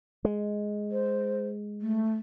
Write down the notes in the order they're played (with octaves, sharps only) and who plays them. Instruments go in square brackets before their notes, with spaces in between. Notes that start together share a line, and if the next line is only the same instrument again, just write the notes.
[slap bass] G#3
[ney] C5
A3